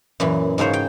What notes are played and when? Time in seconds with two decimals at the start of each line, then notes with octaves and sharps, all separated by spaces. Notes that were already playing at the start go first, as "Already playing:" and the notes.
0.20 F#2 A#2 E3
0.58 G#2 C#3 A#4 C5 C#5
0.73 G5